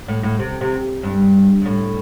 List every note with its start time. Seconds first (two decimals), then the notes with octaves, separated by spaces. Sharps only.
0.08 A2
0.23 A2
0.39 C3
0.61 C3
1.03 G2
1.62 G2
1.66 A2